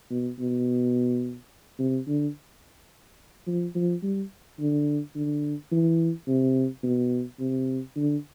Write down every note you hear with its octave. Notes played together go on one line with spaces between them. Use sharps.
B2
B2
C3
D3
F3
F3
G3
D3
D3
E3
C3
B2
C3
D3